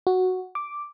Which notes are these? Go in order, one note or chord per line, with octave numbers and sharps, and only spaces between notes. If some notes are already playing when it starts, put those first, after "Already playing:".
F#4
D6